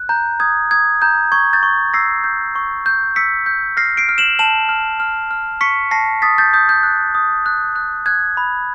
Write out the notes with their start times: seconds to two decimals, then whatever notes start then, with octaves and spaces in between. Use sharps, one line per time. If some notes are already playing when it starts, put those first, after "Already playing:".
Already playing: F#6
0.09 A#5 G6
0.40 D#6 G#6
0.71 D#6 G#6
1.02 A#5 G6
1.32 C#6 G#6
1.53 G6 A6
1.63 C#6
1.93 E6 A#6 C7
2.24 G6
2.55 C#6
2.86 G6
3.16 E6 B6 C#7
3.46 G6
3.77 F6 A#6 C7
3.97 C7 D7
4.09 F6
4.18 E7 F#7
4.39 A5 E7 F#7
4.69 F6
5.00 F6
5.31 F6
5.61 C#6 B6 C#7
5.91 A5 A#6 C7
6.22 D#6 A6 B6
6.38 G6 A6
6.53 D#6 G6
6.69 G6
6.83 F#6
7.15 D#6
7.46 F#6
7.76 F#6
8.06 F#6 G#6
8.37 B5